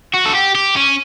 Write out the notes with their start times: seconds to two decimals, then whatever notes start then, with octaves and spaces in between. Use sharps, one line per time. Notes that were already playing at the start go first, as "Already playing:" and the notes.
0.14 F#4
0.26 A4
0.35 G4
0.55 G4
0.76 C#4